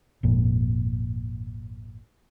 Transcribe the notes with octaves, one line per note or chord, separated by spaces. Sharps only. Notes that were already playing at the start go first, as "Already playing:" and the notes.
G#1 F2 A#2